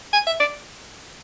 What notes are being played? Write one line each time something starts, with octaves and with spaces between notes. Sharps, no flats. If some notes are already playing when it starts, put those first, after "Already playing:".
G#5
E5
D5